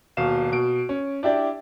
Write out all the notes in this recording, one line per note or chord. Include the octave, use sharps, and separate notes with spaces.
D#1 B2 F5 E7
B2 D7
C#4
D4 E4 G4 D5